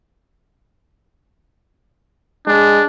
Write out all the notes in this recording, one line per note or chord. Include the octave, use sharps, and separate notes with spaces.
G#3 D4